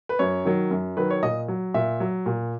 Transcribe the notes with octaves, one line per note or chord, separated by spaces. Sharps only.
B4
F#2 C#5
D#3 F#3
F#2
D#3 F#3 B4
C#5
A#2 D#5
F#3
A#2 E5
F#3
A#2